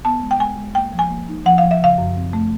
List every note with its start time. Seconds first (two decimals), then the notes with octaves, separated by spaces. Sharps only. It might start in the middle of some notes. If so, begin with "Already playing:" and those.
0.05 B3 A5
0.22 G#3
0.31 G5
0.40 G#3 G#5
0.57 G#3
0.75 A#3 G5
0.93 F3
0.99 G#5
1.10 A#3
1.29 D#4
1.46 F3 F#5
1.58 F3 F5
1.71 E5
1.81 C#3 F5
1.98 F#2
2.16 C4
2.33 A3